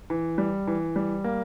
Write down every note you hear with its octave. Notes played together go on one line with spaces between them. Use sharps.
E3
G3
E3
G3
A#3